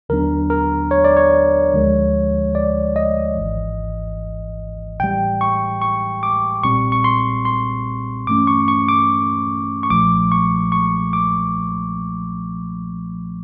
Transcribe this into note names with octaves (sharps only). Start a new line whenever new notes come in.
D#2 D3 F#3 B3 D4 A#4
A#4
C#5
D5
C#5
D2 D3 F3 G#3
D5
D#5
G#1 G#2 E3
A2 E3 G3 G5
C#6
C#6
D6
B1 A#2 G3 C4 C#6
C#6
C6
C6
G2 E3 A3 C#4 D6
C#6
C#6
D6
C#6
B1 A#2 F3 A3 D6
C#6
C#6
D6